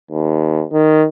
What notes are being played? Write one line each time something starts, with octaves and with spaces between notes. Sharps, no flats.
D#2
D#3